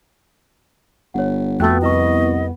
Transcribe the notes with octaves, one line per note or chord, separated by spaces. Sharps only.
G1 C#5 F#5
F2 A3 B3 F#4 G5 F#6
C2 E4 B4 D#5 C#6